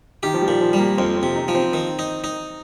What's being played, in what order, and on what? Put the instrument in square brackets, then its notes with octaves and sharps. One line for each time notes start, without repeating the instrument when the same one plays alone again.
[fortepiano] D#3 [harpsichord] G4
[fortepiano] F3
G3
[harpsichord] A#2
[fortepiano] F3
[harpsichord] G3
[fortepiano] A#3
[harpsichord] F2 [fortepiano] C4
[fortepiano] C4
[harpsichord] C3
[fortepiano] D#4
[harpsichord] F3
[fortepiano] C4
[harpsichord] D#3
D#4
D#4